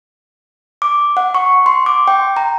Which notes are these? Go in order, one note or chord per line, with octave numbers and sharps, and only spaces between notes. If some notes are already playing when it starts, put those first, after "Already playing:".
D6
F#5
C#6
C6
D6
G5
A#5